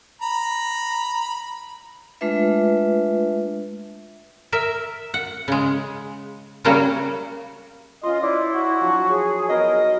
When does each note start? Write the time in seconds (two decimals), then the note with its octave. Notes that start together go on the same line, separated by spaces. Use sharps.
0.22 A#5 B5
2.21 G#3 A3 D4 F4 B4 E5
4.52 A#4 E5
5.14 F#5
5.48 C#3 G#3
6.65 C#3 F#3 G3 A#3 C#4 F#4
8.03 C#4 F4 D#5 C6
8.23 E4 C5 D5
8.54 F#4
8.81 F3 F#3 D4
9.09 G#4 C#5
9.49 B3 D#4 F#4 A#4 D#5